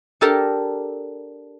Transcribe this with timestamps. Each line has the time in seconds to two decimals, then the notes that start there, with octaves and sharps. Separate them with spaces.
0.21 D4 G4 A4 A#4 A5 A#5